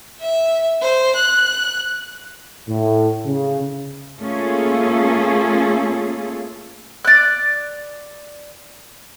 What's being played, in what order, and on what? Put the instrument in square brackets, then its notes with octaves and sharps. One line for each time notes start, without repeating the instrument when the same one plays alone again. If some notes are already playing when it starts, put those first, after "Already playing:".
[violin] E5
C5
F#6
[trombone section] A2
C#3
[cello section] A3 A#3 C#4 F4 G#4 A4
[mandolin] D5 F#6